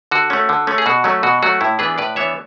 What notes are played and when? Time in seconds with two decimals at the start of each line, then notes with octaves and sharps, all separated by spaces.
0.11 D3 F#4
0.30 A3 C#4
0.49 D3
0.67 A3 C#4
0.78 G#4
0.86 B2 F#4
1.04 F#3 A3 C#4
1.23 B2 F#4
1.43 F#3 A3 C#4 F#4
1.61 A2 E4
1.79 E3 B3 D4 G#4 B4
1.98 A2 B4 D5
2.16 E3 B3 D4 C#5 E5